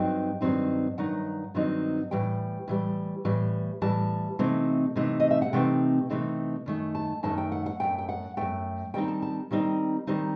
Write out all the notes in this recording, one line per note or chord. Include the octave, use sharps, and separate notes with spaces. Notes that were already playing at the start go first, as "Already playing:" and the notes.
Already playing: G2 F#3 C4 D#4 G5
G2 D#3 F#3 C4 D#4
G2 D#3 F#3 D#4 F#5
G2 D#3 F#3 C4 D#4
A2 E3 G3 G5
A2 E3 G3
A2 E3 G3
A2 E3 G3 A5
C3 E3 A3 C4 D#4
C3 E3 A3 C4 D#4
D#5
E5
F#5
C3 E3 A3 C4 D#4 G5
C3 E3 A3 C4 D#4
F#2 D#3 A3
A5
F#2 D#3 A3 A5
G5
F#5
F#5
F#2 D#3 A3 G5
G5
F#5
F#2 D#3 A3 G5
D#3 G3 C4 D#4 G5
A5
A5
D#3 G3 C4 D#4
D#3 G3 C4 D#4